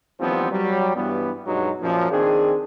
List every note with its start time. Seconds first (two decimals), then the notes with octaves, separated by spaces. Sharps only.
0.20 D#2 E3 F3 G3 B3 C4
0.52 F#3 G3
0.96 G2 E3 G3 B3
1.46 G2 B2 F#3 G#3 D#4
1.81 F#2 A#2 F3
2.11 D#3 C4 D4 G#4